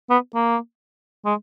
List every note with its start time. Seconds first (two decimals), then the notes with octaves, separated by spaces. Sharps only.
0.10 B3
0.34 A#3
1.25 G#3